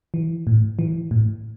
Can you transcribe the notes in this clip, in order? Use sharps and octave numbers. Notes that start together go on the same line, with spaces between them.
E3
A2
E3
A2